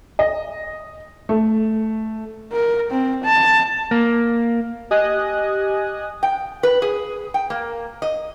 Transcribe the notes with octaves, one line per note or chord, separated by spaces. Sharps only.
D#5
A3
A#4
C4
A5
A#3
G4 D#5 G#5 D#6 F#6
G5
B4
G#4
G5
A#3
D#5